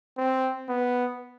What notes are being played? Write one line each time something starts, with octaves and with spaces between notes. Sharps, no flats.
C4
B3